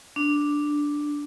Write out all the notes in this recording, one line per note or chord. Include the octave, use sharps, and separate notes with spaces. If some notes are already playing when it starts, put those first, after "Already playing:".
D4